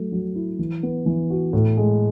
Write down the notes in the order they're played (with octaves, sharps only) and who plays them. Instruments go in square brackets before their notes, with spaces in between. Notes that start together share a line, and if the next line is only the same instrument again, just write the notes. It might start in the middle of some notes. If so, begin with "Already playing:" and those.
Already playing: [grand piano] F#3 A3
F#3
E4
E3
B3
E3
F#4
A2
G#3